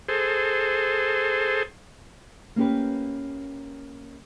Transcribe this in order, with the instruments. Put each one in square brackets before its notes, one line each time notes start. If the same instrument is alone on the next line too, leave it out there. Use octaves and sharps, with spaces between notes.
[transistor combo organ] G#4 A4 C5
[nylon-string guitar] A#3 C#4 G4 B4